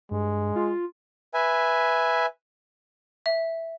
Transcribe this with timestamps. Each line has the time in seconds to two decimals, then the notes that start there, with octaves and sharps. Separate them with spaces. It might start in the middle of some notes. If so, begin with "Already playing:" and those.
0.11 G2 G#3
0.56 F4
1.34 B4 E5 G#5
3.26 E5